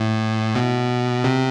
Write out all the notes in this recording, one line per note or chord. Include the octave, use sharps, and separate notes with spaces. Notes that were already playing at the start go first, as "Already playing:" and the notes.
Already playing: A2
B2
C3